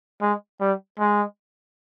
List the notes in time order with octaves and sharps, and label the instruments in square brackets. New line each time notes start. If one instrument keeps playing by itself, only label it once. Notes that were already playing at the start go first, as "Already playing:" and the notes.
[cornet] G#3
G3
G#3